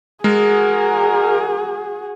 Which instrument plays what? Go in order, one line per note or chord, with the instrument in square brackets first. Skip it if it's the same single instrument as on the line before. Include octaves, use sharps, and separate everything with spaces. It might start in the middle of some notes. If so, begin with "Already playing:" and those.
[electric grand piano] G#3 [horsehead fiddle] F#4 G#4 [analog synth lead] A#4